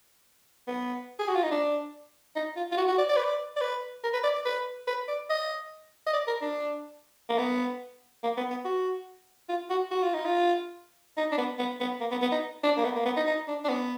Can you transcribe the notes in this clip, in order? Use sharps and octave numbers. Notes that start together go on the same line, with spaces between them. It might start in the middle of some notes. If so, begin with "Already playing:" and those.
B3
G#4
F#4
F4
D#4
D4
D#4
F4
F4
F#4
F#4
D5
D5
B4
D5
D5
B4
A#4
B4
D5
D5
B4
B4
D5
D#5
D#5
D5
A#4
D4
A#3
B3
A#3
B3
B3
F#4
F4
F#4
F#4
F4
D#4
F4
D#4
D4
B3
B3
B3
A#3
B3
B3
D#4
D4
A#3
B3
A#3
B3
D#4
D#4
D4
D4
B3